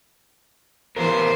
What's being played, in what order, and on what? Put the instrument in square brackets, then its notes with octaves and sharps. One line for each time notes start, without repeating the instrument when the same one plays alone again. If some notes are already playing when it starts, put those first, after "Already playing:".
[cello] E3 C5 [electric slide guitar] B3 G4 A#4